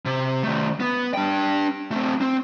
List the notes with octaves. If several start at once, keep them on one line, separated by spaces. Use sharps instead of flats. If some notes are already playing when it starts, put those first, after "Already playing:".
C3
D#3 A3
B3
D4 G5
A3 C4
C4